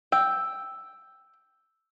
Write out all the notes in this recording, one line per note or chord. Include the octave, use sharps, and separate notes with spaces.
G5 E6